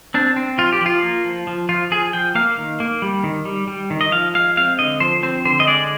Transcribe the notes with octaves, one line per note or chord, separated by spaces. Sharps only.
C4 D4
C4
F3 F4
G4
F3 F4
A#3
F3
F3
F3 F4
F3 G#4
F3 G5
A#3 F5
D#3
A#3
G3
D#3
G3
G3
D#3
D#5
F3 F5
G#3 F5
C4 F5
D3 D#5
F3 C5
C4 C5
D3 C5
D#5
G#3 D5